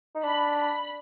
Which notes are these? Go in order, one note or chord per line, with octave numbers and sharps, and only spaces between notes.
D#4
D4 B5
B5